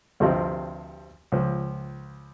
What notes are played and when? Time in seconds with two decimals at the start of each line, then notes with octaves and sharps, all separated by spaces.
0.20 D2 G2 C3 F3 C4 D#5
1.32 C#2 F3